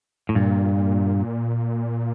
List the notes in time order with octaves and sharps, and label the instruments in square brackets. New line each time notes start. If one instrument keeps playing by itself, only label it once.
[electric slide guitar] A2
[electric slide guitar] G2 [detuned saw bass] A#2